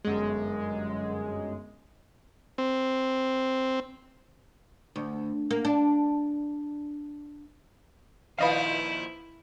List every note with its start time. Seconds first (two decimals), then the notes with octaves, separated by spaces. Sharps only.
0.05 G1 F#2 G#3
2.58 C4
4.96 D2
5.50 A#3
5.65 D4
8.38 A#2 D#3 F3 E4 B4 D#5 F5